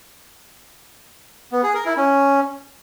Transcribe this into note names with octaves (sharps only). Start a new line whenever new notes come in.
B3
G#4
A#4
E4
C#4